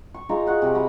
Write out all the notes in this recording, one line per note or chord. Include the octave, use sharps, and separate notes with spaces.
C#6
G#3 D#4 F4 A#5
F#4 F#5 C#6
C3 G#5
F#4 A#5 B5